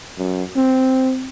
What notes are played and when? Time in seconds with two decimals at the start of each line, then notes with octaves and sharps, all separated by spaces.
0.18 F#2
0.57 C4